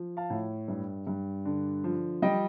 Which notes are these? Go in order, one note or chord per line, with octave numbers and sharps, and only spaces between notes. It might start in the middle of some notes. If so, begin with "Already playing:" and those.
Already playing: F3
F5 A5
A2
G2
G2
D3
F3
G3 D#5 G5